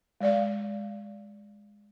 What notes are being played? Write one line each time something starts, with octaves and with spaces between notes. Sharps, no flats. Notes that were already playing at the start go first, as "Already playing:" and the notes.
G#3 D5 F5